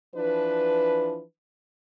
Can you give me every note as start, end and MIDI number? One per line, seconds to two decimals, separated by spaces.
0.15 1.22 52
0.15 1.22 53
0.15 1.22 62
0.15 1.22 71